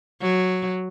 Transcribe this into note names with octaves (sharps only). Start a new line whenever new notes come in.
F#3